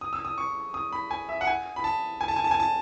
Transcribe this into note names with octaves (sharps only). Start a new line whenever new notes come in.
D#6
E6
D#6
C#6
D#6
B5
G#5
E5
F#5
G#5
B5
A5
G#5
A5
G#5
A5
G#5
A5